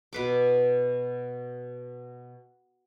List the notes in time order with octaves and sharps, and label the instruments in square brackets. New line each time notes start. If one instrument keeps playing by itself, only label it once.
[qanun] B2 B4 D6